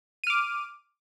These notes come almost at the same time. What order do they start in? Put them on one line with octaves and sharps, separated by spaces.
D#7 F6 D6